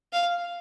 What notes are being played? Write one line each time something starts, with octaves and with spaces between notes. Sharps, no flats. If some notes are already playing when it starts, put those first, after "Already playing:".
F5